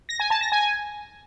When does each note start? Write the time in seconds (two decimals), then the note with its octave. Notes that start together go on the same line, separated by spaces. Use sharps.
0.09 A#6
0.20 G#5
0.30 A5
0.41 A#6
0.52 G#5